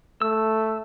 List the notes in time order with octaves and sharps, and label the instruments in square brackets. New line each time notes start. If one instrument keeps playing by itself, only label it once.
[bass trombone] A3 [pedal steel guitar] E6